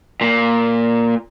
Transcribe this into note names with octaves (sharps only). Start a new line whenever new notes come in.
A#2